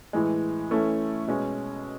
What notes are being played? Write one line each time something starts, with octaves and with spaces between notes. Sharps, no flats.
A2 E3 G#3
E3 A3 C#4 E4 A4
B2 G#3 C#4